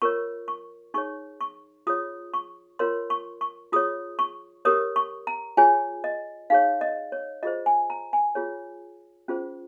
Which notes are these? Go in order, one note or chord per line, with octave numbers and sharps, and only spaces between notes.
F4 A#4 C#5 C#6
C#6
D#4 G#4 C#5 C#6
C#6
F4 G#4 C#5 D#6
C#6
F4 A#4 C#5 C6
C#6
C#6
F4 G#4 C#5 D#6
C#6
G4 A#4 C#5 D#6
C#6
A#5
F4 G#4 C#5 G#5
D#5
D#4 G#4 C#5 F5
D#5
C#5
F4 G#4 C5 D#5
G#5
A#5
G#5
F4 G#4 C#5
C#4 F4 G#4 C5